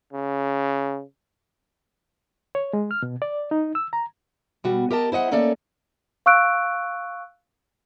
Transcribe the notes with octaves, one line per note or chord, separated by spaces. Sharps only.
C#3
C#5
G#3
F6
B2
D5
D#4
E6
A#5
B2 G3 F#4
G4 A#4 D#5 A5
E4 C5 D#5 F#5
A3 A#3 C#4 A4 D5
F5 C#6 E6 F#6 D7